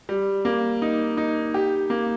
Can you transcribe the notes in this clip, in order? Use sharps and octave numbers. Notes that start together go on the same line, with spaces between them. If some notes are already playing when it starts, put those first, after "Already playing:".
G3
A#3
D#4
D#4
G4
A#3